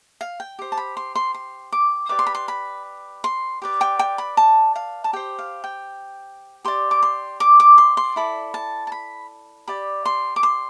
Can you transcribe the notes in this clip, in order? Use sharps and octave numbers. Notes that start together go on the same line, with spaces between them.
F5
G5
G4 C5
A5
B5
C6
C6
C6
D6
G4 B4 D5 D6
C6
B5
C6
B5
C6
G4 B4 D5
G5
G5
B5
A5
F5
A5
G4 C5 G5
F5
G5
G4 D5 C6
D6
C6
D6
D6
C6
C6
E4 A4 D5 B5
A5
A5
B5
G4 D5 B5
C6
D6
C6